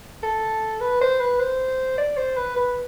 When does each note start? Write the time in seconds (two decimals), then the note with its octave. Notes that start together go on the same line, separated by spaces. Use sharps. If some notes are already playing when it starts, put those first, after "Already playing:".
0.23 A4
0.81 B4
1.01 C5
1.20 B4
1.40 C5
1.98 D5
2.17 C5
2.37 B4
2.56 B4